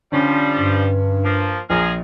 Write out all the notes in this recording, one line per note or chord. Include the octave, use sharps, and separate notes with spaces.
D3 F3 G3 C#4
G2
F3 A#3
A#1 F3 G#4 A#4